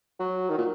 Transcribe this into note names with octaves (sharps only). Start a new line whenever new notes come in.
F#3
D#3
A#2